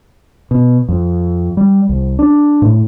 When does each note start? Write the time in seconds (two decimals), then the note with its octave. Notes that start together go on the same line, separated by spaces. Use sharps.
0.51 B2
0.89 F2
1.57 G3
1.89 C2
2.19 D4
2.62 A2